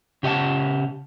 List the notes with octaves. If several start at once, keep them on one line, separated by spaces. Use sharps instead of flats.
C#3 G4 D#5 F#5 A5